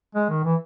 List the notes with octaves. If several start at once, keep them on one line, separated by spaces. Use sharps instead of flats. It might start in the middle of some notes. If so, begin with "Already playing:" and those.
G#3
D#3
E3